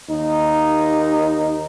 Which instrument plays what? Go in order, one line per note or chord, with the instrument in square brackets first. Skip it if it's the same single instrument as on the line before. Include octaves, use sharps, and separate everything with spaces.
[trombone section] D#2 D#4